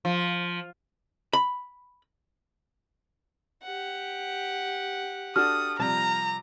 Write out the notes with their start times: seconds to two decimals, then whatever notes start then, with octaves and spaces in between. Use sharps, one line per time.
0.05 F3
1.33 B5
3.63 G4 F#5
5.36 D4 F#4 A4 D#6 F6
5.79 C3 F3 G3 A#5